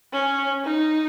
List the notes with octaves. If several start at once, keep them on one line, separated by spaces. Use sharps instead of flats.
C#4
D#4